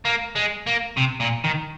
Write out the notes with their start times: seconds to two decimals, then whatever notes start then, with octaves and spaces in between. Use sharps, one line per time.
0.05 A#3
0.35 G#3
0.67 A#3
0.97 C3
1.20 A#2
1.44 D#3